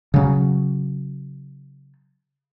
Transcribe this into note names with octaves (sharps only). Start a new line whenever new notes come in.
C#3 F#3